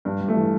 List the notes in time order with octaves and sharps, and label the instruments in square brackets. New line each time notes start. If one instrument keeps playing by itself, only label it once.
[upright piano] G2 [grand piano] G3
[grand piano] G3
[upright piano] A3
[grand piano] E3